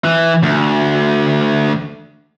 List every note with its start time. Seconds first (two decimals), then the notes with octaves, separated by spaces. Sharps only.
0.04 E3
0.43 D2